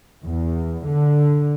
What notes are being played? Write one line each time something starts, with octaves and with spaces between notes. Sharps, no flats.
E2
D3